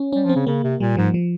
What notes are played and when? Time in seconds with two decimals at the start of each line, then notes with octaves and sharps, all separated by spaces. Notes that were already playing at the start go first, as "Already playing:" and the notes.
Already playing: C#4
0.13 G3 C#4
0.24 F3
0.29 C4
0.36 C#3
0.47 C#3 A#3
0.64 C3
0.80 A#2 G3
0.97 G#2 F3
1.14 F3